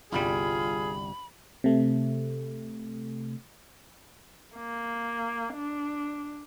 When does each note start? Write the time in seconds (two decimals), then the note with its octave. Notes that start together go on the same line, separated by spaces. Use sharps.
0.12 G1 C2 G3 F4 G#4 B5
1.64 C3 A3
4.56 A#3
5.54 D4